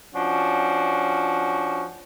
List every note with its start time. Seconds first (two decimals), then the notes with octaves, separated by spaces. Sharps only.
0.15 F3 C#4 D4 F#4